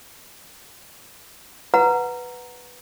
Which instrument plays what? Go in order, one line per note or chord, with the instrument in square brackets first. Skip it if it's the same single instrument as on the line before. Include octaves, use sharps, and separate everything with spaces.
[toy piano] B4 F#5 A#5